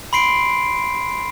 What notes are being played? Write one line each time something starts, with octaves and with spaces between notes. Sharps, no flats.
B5 C6 C7 D7